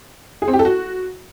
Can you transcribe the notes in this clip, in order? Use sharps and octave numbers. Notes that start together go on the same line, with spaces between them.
G#4
C4
G4
A4
F#4